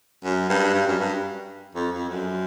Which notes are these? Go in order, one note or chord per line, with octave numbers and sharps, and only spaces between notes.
F#2
G2
G2
F#2
G2
F2
F2
F#2